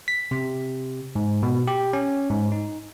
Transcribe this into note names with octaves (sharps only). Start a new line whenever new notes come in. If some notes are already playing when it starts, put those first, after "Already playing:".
B6
C3
G#2
B2
G4
C#4
G#2
D#4